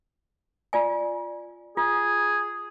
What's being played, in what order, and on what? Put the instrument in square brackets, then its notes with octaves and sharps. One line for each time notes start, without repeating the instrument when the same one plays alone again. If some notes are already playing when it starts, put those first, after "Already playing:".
[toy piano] F4 D5 G#5
[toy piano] F4 [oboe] G#4